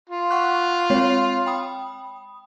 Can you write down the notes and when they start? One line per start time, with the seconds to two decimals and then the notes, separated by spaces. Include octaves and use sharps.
0.09 F4
0.30 F#5 C#6 F#6
0.90 G#3 C4 C#5
1.46 G5 B5 D#6